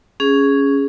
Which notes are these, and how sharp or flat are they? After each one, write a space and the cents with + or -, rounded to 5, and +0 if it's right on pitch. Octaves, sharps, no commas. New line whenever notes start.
C#4 +5 G#4 +0